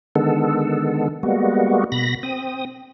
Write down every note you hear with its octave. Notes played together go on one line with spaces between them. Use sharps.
D3 D#3 G#3 B3 A4
G3 G#3 A#3 B3 F#4
B2 B5 A#6
C4 D#6